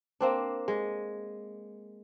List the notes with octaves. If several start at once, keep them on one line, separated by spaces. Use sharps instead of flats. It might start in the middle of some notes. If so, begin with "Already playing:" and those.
A#3 C4 D4
G#3